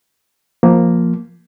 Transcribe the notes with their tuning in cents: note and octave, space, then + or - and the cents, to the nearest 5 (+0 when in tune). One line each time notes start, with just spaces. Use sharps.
F3 +0 A#3 +0